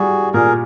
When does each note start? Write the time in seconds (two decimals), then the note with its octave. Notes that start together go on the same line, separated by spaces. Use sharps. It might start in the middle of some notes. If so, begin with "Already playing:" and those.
Already playing: G3 E4 F#4 G#4
0.34 A#2 G#4 A#4